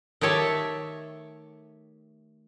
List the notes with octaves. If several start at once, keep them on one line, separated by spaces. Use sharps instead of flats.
D#3 A3 G4 C#5 E5 A5